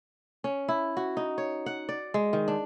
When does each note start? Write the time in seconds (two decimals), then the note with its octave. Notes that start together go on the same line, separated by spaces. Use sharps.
0.44 C#4
0.68 E4
0.97 F#4
1.17 D#4
1.38 C#5
1.66 F#5
1.89 D5
2.14 G#3
2.33 D#3
2.48 D4